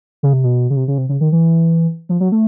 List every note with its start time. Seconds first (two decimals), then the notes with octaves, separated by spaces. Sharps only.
0.23 C#3
0.33 C3
0.44 B2
0.70 C#3
0.76 C3
0.88 C#3
0.98 C3
1.09 C#3
1.21 D#3
1.32 E3
2.09 F3
2.20 F#3
2.32 A3